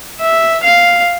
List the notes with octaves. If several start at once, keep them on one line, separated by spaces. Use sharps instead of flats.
E5
F5